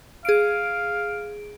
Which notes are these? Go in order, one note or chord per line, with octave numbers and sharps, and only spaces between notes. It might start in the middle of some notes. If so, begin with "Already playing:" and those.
G#4 F5 D7